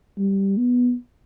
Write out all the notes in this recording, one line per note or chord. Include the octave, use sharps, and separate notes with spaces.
G3
B3